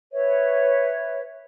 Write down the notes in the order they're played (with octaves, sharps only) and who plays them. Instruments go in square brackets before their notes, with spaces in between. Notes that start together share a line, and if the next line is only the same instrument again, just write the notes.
[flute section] B4 C#5 E5